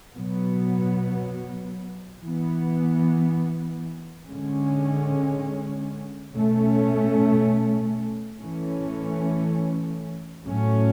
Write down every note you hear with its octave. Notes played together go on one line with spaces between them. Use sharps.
B2 F#3 B3
E3 B3
D3 G#3 C#4
B2 A3 C#4
E3 A3 C#4
A2 F#3 A3 C#4